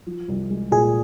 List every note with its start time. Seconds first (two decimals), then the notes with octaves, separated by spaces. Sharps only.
0.06 F3
0.28 C2
0.50 G#3
0.71 A#2 G#4